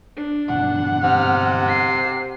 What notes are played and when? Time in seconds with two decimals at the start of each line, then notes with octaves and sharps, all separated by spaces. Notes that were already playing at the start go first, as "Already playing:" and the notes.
0.17 D4
0.48 G1 E2 B2 F#5
1.04 C3 F6
1.68 C7